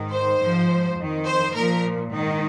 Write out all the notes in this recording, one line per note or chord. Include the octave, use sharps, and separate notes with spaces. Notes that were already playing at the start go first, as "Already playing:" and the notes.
Already playing: G#2 D#3
C5
G#2 F3
F2 D#3
C5
A#2 F3 A#4
G#2 D#3